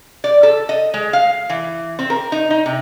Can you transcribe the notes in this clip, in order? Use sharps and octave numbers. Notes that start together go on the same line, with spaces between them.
D5
A4
D#5
G#3
F5
E3
C4
A#4
D#4
D#4
C3